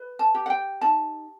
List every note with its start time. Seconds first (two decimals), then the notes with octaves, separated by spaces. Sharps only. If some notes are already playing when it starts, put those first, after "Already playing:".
Already playing: B4
0.19 A5
0.34 G4
0.46 F#5
0.50 G5
0.81 D#4 A5